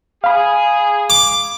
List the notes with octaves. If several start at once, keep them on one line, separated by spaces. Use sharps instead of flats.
G#4 F5 B5
D6